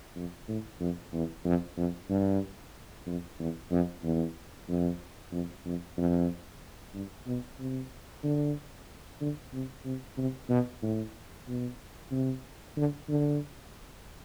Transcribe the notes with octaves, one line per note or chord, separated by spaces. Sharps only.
F2
A2
F2
E2
F2
F2
G2
F2
E2
F2
E2
F2
F2
F2
F2
G2
B2
C3
D3
D3
C3
C3
C3
B2
A2
B2
C3
D3
D3